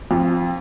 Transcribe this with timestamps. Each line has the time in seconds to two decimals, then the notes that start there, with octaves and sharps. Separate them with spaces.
0.11 F2